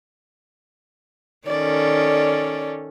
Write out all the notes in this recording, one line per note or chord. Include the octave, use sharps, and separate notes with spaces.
D#3 C#4 A4 D5